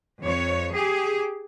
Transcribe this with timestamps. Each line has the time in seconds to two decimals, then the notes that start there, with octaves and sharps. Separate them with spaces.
0.21 F2 C#5
0.73 G4 G#4